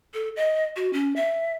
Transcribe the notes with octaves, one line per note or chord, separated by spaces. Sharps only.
A4
D#5
F#4
C#4
E5